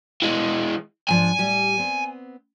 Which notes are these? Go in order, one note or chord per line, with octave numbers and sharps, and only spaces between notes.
E3 G#3
G#2 F3 D4 G#5
A2 G3 G4
B3 C4